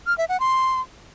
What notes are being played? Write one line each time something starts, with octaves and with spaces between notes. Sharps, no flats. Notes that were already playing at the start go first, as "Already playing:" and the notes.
F6
E5
F#5
C6